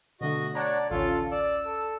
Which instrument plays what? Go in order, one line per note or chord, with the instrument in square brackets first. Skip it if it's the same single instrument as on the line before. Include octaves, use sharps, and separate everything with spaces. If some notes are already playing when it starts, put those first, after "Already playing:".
[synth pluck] B2 D3 A3 [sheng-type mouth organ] F#4 D#5
[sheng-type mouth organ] D4 C#5 [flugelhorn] D5 [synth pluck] F#5 A5 A#5
[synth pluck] A1 D2 C#4 [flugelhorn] F4 [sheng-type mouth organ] A4
[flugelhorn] D5 [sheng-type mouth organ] E6
[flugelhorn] A4